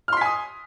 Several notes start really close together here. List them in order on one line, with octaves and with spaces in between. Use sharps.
F6 C6 B6 G#5 D#6